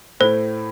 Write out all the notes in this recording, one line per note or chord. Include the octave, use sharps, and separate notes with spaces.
A2 A3 E4 C5